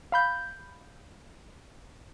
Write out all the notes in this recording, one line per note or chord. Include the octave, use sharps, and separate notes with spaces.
F5 B5 G6